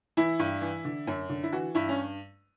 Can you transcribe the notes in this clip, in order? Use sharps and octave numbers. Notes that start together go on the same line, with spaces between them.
E3 E4
G2
E3
D3
F#2
D3
E4
E3 F#4
G2 E4
C#4